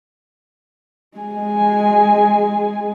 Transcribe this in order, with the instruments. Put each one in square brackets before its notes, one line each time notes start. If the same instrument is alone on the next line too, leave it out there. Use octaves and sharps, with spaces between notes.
[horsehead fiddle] G#3 G#5